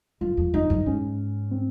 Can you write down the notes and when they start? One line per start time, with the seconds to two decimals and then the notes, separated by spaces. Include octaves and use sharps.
0.21 F#2 F4
0.37 F2
0.54 F2 D#4
0.70 F#2
0.86 G#2 C#4
1.51 C4